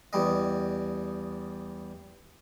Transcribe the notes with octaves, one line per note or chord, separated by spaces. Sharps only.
E2 G3 D#5